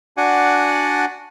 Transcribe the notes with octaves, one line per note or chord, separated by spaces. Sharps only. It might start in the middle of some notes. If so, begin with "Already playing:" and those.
D4 F#4 D5 F#5 G#5